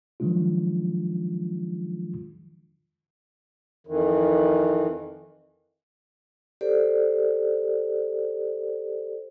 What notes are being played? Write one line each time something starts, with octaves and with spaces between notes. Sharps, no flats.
D#3 F3 F#3 G#3 D4 F4
F2 D#3 E3
G4 A4 C5 D5